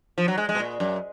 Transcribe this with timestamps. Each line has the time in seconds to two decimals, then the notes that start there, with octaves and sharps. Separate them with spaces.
0.18 F3
0.28 F#3
0.38 G#3
0.49 G#3
0.55 B2
0.59 A#2
0.80 F#2